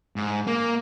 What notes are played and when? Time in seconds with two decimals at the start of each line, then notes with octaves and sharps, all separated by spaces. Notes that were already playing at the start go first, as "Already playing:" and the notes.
0.16 G#2
0.47 A#3